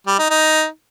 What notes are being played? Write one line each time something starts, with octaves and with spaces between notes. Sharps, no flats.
G3
D#4
D#4